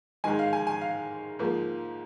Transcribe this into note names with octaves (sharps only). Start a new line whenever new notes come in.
G#2 D#3 G#3 G#5
F5
G#5
G#5
F5
G#2 F3 A#3